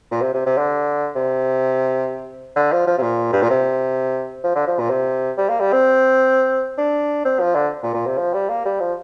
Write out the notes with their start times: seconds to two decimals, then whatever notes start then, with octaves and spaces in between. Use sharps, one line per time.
0.11 A#2
0.22 C3
0.34 C3
0.46 C3
0.58 D3
1.15 C3
2.56 D3
2.72 F3
2.87 F3
2.98 C3
3.02 A#2
3.32 G2
3.42 A#2
3.50 C3
4.44 F3
4.55 D3
4.67 F3
4.79 A#2
4.89 C3
5.37 G3
5.49 A#3
5.60 G3
5.73 C4
6.78 D4
7.25 C4
7.40 F3
7.55 D3
7.83 A#2
7.94 A#2
8.06 C3
8.18 F3
8.34 G3
8.49 A#3
8.65 G3
8.80 F3